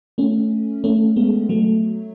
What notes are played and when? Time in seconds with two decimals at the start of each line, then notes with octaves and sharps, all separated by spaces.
0.18 A3 C#4
0.84 A3 C#4
1.16 G#3 B3
1.49 F#3 A3